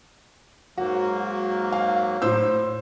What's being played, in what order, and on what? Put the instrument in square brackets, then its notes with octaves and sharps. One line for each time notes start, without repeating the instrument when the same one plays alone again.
[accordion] G#2 F#3 A#3 [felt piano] F#4
[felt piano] F5
A2 C5 E6